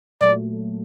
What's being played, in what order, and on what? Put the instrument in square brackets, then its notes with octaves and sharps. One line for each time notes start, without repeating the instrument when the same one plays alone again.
[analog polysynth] A#2 F#3 A3 [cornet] D5